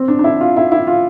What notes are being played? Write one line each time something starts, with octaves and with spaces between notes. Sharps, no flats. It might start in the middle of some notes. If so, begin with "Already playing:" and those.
Already playing: C4
D4
D4
E4
F4
E4
E4
F4